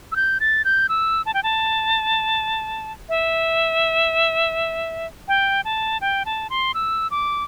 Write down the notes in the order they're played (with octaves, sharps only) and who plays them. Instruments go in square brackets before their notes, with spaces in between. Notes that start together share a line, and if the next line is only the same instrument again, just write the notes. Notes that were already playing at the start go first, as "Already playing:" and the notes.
[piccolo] E6
G6
A6
G6
E6
A5
G5
A5
E5
G5
A5
G5
A5
C6
E6
D6